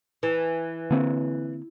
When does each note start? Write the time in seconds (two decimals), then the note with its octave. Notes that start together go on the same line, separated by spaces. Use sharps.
0.23 E3
0.91 D3 A#3 C4